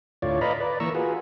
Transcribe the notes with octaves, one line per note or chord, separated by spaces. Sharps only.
D2 A2 F4 C#5 D5
B4 D5 D#5 F5 A#5 B5
B4 D5
E3 A#3 A#5 C#6 E6
F4 F#4 G#4 B4